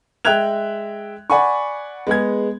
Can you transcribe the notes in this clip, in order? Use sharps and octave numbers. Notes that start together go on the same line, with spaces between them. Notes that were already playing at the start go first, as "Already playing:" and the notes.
G#3 E5 G5 F#6 G#6 F7
D5 F#5 G#5 B5 C#6
G#3 B3 G#4 G#6